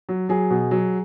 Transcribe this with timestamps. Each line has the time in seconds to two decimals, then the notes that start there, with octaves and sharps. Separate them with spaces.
0.09 F#3
0.29 F#3 G#4
0.51 B2
0.71 F#3